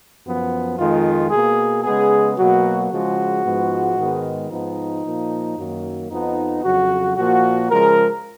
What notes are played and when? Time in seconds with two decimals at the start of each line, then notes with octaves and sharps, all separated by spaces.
0.24 F#2 F3 B3
0.77 F2 D#3 G#3 F4
1.30 B2 A#3 G#4
1.84 C#3 G#3 B3 G#4
2.38 B2 F#3 A#3 F#4
2.90 C#3 F3 G#3 F#4
3.43 G#2 F3 G#3 B3
3.97 G#2 D#3 G#3 B3
4.50 G#2 F3 B3 D#4
5.04 A#2 F3 A#3
5.57 F#2 D#3 F#3 A#3
6.10 F2 F3 B3 D#4
6.63 F2 C#3 F#3 F#4
7.17 A#2 F3 A#3 F#4
7.70 C#3 F3 G#3 A#4